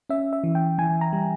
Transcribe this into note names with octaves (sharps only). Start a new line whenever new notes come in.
C#4 E5
E5
E3
G5
E3 G#5
A#5
G3